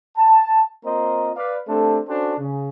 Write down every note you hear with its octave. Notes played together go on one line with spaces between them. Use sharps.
A5
A#3 C4 F4 C5 D#5 A#5
B4 D5 F5
A3 C4 D4 G4 A4
C#4 D4 F#4 A4 C5
C#3